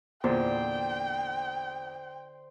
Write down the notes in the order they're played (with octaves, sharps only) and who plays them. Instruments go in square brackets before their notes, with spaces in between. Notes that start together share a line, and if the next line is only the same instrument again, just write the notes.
[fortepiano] E2 A#2 [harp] D3 [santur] C5 [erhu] G5